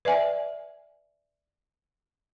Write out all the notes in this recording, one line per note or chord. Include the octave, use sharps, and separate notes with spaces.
B4 D5 E5 G#5